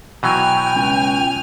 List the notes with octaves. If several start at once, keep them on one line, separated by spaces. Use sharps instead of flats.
B2 E3 F#3 G5 G#5 F6
C#2